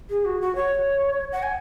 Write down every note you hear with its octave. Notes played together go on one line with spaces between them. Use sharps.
G#4
F#4
F#4
C#5
F#5
G#5